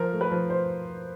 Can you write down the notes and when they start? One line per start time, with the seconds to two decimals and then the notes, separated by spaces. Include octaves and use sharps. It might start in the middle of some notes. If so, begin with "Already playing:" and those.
Already playing: F3 A#4
0.12 A3
0.21 B4
0.31 F3
0.50 C5